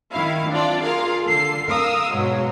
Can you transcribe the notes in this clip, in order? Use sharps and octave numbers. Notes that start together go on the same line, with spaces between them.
D#3 E4 F5
C4 D4 F4 D5
F4 G#4 A#4 F5
D3 A4 C7
A#4 F5 D#6 E6
G#2 B2 F#3 G#3